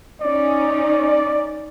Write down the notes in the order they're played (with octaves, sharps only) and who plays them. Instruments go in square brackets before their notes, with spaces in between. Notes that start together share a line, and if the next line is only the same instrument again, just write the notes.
[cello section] C#4 D#4 [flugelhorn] D5